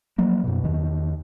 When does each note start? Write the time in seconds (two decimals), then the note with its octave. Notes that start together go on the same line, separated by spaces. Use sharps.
0.18 F3 F#3 A#3
0.44 F#2 B2
0.64 E2 D#3